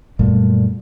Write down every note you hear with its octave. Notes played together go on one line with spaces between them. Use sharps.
F#2 A#2 G3 A3